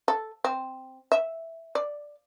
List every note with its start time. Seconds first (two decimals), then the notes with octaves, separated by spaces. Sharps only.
0.08 A4
0.44 C4
1.12 E5
1.75 D5